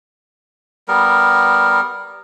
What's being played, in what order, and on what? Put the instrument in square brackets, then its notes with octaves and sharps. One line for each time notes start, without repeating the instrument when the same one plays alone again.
[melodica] G3 B3 A#4